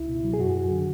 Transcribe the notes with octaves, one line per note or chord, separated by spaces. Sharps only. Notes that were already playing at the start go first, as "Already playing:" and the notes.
Already playing: C#2 E4
B2
F#3
G#4
F#2 F#4
F#2
D3